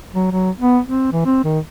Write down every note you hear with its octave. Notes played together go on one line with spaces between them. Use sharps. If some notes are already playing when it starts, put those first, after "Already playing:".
F#3
F#3
B3
C4
E3
C4
D#3